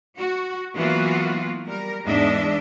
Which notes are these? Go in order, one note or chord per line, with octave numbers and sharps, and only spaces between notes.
F#4
E3 F#3 A#3 B3 F4 F#4
G3 A#4
E2 G#2 G#3 D4 D#5 E5